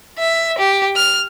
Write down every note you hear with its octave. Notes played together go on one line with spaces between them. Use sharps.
E5
G4
F6